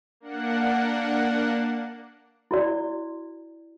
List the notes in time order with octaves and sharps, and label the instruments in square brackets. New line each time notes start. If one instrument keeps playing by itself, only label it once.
[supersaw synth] A#3 D4 F#5
[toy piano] E4 F#4 D5